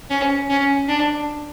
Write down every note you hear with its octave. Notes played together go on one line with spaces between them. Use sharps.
C#4
C#4
D4